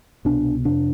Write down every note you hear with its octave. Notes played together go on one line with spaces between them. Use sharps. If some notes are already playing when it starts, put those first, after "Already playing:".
C2 B2 D4
F2 C3 D4